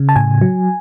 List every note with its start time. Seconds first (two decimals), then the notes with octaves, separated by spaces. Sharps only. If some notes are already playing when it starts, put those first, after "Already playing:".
Already playing: C#3
0.09 A5
0.16 A2 G#5
0.41 F#3